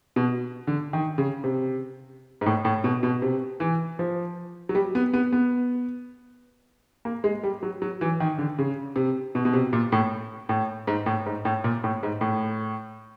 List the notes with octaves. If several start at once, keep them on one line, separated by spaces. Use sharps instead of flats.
B2
D3
D#3
C#3
C3
G#2
A2
A2
B2
B2
C3
E3
F3
F#3
G3
B3
B3
B3
A#3
G#3
G3
F#3
F#3
E3
D#3
D3
C#3
C3
B2
B2
C3
A#2
A2
A2
G#2
A2
G#2
A2
A#2
A2
G#2
A2